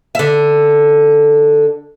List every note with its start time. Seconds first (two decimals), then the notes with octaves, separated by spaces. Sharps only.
0.15 D3 E5